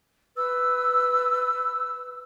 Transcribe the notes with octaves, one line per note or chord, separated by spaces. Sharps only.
B4 E6